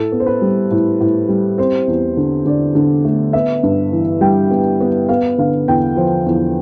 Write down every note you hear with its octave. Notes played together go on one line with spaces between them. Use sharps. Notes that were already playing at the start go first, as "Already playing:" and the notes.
Already playing: A2 A4
B3
C5
B4
G3
A2
A2
G3
C4 C5
E2
D3
D3 D5
D3
A3
B3 E5
G2
E3
G3 G5
B3
B3
B3 F5
D3 F5
E2 G5
F3 C5
E2